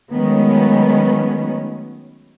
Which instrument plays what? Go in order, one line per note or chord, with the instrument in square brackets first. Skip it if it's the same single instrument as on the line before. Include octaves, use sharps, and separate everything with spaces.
[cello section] D#3 F#3 G#3 A3 B3 C#4